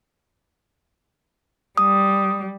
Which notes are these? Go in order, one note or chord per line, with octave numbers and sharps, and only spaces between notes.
G3 D#6